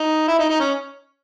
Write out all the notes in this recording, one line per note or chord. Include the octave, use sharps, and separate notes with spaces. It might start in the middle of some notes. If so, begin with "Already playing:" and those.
Already playing: D#4
E4
D#4
D#4
C#4